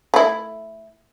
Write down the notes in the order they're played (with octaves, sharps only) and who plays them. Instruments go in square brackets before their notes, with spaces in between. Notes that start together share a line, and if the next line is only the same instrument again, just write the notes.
[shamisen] A3 E4